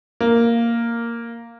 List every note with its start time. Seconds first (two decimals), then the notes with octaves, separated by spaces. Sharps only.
0.20 A#3